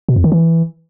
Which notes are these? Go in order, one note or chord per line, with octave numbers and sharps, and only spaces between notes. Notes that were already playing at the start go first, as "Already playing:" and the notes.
B2
F2
D#3
E3